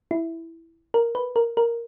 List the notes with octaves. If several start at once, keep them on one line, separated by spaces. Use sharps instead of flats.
E4
A#4
B4
A#4
A#4